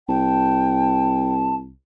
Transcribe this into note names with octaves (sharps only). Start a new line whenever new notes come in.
C2 G5 A5